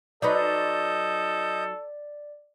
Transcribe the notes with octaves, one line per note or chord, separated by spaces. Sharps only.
F#3 D#4 A4 B4 D5 D#5 G6